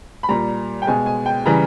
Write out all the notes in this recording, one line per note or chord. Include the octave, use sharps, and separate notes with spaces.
B5
A#2 G3 A#5
G5
B2 G#3 G#5
G#5
G5
C#3 E3 G3 A#5